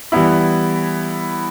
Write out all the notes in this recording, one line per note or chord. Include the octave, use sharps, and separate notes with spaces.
E3 G3 B3 E4